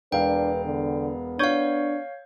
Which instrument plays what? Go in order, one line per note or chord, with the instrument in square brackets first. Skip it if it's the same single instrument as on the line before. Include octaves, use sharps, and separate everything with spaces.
[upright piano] E1 F5 [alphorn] D4 [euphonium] B4 [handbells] G5
[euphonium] D3 [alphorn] B3
[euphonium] D4 [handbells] C#5 F5 [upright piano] C#6 G6 G#6